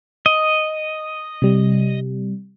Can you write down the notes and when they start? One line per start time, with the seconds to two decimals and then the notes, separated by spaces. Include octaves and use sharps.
0.26 D#5
1.42 C3 G3